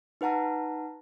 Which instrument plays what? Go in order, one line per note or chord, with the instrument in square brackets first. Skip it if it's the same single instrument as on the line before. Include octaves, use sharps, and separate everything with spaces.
[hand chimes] D#4 B4 F#5 A5 A#5